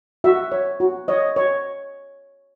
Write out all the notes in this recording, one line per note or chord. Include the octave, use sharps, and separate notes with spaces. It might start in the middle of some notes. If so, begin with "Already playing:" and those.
F#4 E5
C#5
F#4
C#5 D#5
C#5